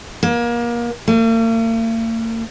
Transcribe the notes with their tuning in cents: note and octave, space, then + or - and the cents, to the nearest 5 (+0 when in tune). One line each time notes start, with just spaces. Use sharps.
A#3 +30
A#3 -45